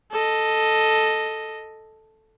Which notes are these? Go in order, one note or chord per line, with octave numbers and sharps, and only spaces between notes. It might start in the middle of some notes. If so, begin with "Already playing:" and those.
A4 D#5